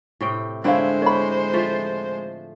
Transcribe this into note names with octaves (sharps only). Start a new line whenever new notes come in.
A2 C3 G5
D3 G#3 C4 D4 E4 C5 C#5 F5
C#5 B5
F3 A3